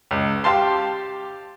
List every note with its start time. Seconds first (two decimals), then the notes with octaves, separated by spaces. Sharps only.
0.11 C#2
0.44 G4 F5 A5 C6